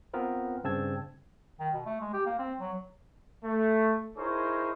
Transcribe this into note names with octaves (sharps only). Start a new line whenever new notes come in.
B3 C4 F4 A#4 B4
G2 C#3 C4 A5 E6 G#6
D#3
B2
A3
G#3
G4
A#3
C4
F#3
A3
D#4 E4 G#4 A#4 C5 C#5